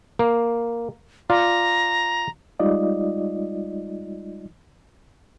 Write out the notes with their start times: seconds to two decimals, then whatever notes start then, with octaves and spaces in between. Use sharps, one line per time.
0.19 A#3
1.30 F4 D5 A#5
2.60 G3 G#3 D#4 F4 D5 D#5